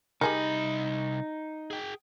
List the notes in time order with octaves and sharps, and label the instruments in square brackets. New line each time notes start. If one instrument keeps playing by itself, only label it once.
[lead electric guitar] C2 B5 [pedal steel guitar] D#4 [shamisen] G4 G#4 A#4
[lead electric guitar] G#4 G5